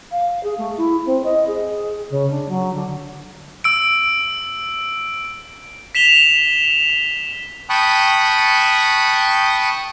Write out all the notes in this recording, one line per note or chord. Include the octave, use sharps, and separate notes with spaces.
F5
G#4
A3
E4
C4
D#5
G#4
C#3
D4
F#3
D3
E6 D7
B6 E7 F7 G7
G5 A5 B5 C#6 D#6 F#6